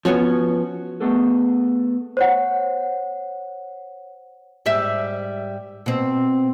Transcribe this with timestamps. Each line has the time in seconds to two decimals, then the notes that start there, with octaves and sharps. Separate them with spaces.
0.05 F3 B3 C#4 F#4 C#5
1.00 A3 B3 G#4 A4 B4
2.17 C5 C#5 F#5
4.66 G#2 G3 E5
5.86 B2 C4